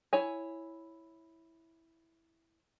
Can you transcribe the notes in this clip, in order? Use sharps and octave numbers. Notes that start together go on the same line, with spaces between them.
E4 C#5 G#5